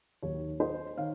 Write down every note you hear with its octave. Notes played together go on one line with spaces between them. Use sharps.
D#2 D#3 F#3 C#5
C5 D#5
D#3 C#5 F5